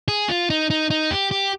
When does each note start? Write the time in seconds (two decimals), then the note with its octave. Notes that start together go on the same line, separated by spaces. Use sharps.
0.08 G#4
0.29 F4
0.50 D#4
0.70 D#4
0.90 D#4
1.11 G4
1.31 G4